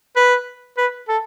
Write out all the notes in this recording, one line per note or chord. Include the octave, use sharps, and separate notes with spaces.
B4
B4
A4